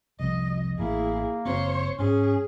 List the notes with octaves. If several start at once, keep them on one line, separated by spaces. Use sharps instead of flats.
C2 F2 D#5
A1 A#3 E4 G#4
F#1 C4 C5 C#5
G#2 C#4 G#4